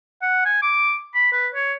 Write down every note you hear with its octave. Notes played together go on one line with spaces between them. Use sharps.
F#5
G#5
D6
B5
B4
C#5